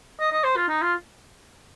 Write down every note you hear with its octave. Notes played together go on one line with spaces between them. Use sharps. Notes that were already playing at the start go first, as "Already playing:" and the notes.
D#5
D#5
C5
F4
D#4
F4